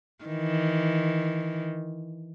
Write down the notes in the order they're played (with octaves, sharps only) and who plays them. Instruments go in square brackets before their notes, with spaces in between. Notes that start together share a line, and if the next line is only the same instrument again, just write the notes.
[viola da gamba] D#3 E3